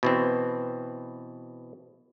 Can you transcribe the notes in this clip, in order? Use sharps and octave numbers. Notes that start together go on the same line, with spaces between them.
B2 E3 C4